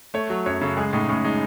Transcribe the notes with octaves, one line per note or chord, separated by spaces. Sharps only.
A3 C#5
F#3
F#2 C#5
C#3 A4
G#3 G#4
A2 D#4
A2 C#4
G#3 D#4